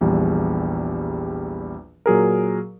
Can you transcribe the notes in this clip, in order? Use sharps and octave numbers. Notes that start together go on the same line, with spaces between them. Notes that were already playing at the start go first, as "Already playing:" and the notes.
A#1 E2 G3
A#2 F#3 G#4 A#4